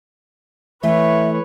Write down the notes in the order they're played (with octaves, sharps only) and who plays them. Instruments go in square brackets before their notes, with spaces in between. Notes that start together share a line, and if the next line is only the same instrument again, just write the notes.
[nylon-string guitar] E3 A3 [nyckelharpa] B4 C#5 [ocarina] E5